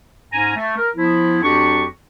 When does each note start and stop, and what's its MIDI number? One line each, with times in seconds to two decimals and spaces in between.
0.32 0.55 44
0.32 0.55 61
0.32 0.55 80
0.32 0.55 82
0.55 0.75 57
0.77 0.88 70
0.96 1.38 53
0.96 1.38 59
0.96 1.38 64
1.43 1.85 41
1.43 1.85 54
1.43 1.85 62
1.43 1.85 66
1.43 1.85 67
1.43 1.85 85